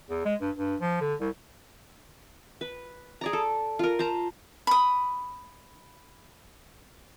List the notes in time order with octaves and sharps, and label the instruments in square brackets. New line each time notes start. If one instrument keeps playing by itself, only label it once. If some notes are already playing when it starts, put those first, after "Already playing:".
[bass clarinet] E2
G#3
G2
G2
F3
D3
C2
[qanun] B4
G#4 D5 A#5
A4
F4 A#4
C5 A5 A#5
[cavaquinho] B5 D#6